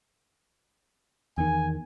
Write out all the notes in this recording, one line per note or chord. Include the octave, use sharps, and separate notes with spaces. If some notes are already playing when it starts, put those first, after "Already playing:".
E2 D#3 G#5